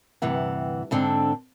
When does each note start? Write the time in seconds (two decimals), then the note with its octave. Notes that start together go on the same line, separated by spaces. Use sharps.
0.22 D2 G2 C3 E3 F#5
0.91 G#2 D3 C4 D4